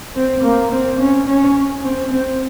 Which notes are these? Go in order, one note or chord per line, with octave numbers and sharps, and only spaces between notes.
C4
A#3
C4
C#4
C#4
C4
C4